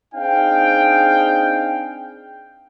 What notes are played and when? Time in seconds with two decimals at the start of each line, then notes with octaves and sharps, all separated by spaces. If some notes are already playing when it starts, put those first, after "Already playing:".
0.15 C4 D4 D#4 G#4 F5 G5